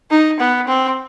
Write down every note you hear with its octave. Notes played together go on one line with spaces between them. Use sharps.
D#4
B3
C4